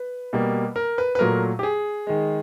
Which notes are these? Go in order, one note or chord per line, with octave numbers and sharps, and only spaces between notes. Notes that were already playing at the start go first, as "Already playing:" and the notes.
Already playing: B4
B2 G3 A#3
A#4
B4
B4
A#2 F#3 A3 A#4
G4
G#4
D#3 G#3